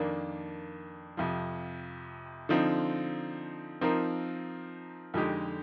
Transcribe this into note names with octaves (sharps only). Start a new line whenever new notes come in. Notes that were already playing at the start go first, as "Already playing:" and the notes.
Already playing: F2 D#3 A#3 D4
F2 C3 F3
D3 F3 C4 D#4
F3 C4 D#4 A#4
F2 D3 G#3 D#4 G4